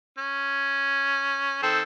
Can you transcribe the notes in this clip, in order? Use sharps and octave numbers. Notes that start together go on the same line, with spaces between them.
C#4
D#3 C4 A4